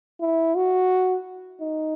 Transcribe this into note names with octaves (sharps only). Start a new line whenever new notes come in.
E4
F#4
D#4